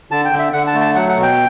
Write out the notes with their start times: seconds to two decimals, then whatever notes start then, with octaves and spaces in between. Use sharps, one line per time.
0.11 D3 A5
0.25 G5
0.32 D3
0.39 E5
0.53 D3 F#5
0.67 A5
0.74 A3
0.81 A5
0.95 F#3 F#5
1.09 F#5
1.16 B2
1.23 G5